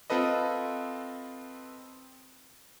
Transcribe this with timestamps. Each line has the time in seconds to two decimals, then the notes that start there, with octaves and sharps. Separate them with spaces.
0.10 C4 F4 A4 B4 D#5